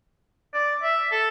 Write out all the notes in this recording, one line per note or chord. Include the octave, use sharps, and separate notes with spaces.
D5
E5
A4